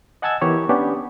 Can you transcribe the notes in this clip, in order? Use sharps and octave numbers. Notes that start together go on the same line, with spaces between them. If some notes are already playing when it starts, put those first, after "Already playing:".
D#5 F#5 G#5 A5 E6 G#6
E3 B3 G4 A#4 B4 C#5
B3 C#4 D4 G4